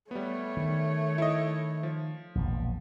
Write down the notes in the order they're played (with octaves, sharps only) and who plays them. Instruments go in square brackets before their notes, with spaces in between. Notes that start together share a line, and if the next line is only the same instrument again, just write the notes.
[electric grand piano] G3 B3 [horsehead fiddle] A3 C#5
[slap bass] D#3
[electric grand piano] E4 D#5
F3
[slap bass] E1 A#1